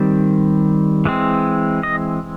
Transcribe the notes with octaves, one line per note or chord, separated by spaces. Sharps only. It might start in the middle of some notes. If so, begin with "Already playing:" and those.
Already playing: D#3 G3 C4
E3 G#3 C4
D#5